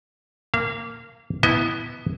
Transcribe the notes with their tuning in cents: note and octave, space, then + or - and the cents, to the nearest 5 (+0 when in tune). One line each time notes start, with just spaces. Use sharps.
A#3 -10 F5 -35
B3 +0 E4 -5 D#5 +35